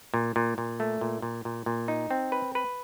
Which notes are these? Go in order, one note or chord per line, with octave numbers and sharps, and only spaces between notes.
A#2
A#2
A#2
A3
A#2
A#2
A#2
A#2
D#4
C4
B4
B4